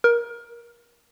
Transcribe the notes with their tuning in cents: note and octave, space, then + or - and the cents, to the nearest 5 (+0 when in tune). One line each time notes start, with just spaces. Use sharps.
A#4 +20